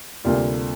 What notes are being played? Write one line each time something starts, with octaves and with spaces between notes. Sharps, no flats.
D2 C3 G3 A#3 F4